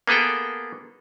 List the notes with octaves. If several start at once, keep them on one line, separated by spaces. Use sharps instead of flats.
A#3 B3 G#4 A4 G5